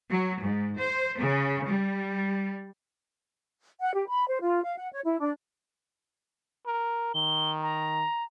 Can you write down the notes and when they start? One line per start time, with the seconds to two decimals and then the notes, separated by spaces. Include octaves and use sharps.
0.11 F#3
0.43 G#2
0.78 C5
1.18 C#3
1.68 G3
3.80 F#5
3.93 G4
4.07 B5
4.26 C5
4.41 F4
4.63 F5
4.77 F#5
4.92 C#5
5.04 E4
5.19 D4
6.66 A#4
7.15 D#3 G7
7.62 A#5